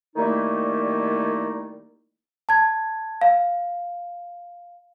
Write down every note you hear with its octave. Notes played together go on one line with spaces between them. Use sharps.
D#3 G3 A3 A#3 D#4 E4
A5 G#6
F5